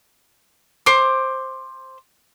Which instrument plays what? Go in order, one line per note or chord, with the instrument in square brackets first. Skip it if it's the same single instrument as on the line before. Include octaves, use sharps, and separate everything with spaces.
[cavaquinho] C5 D6